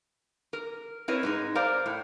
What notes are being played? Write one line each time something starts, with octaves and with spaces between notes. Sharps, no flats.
A#4
C4 E4 A#4 B4 C#5 D#5
G#2 G#3 D#4
A#4 C5 D5 F5 A#5
A2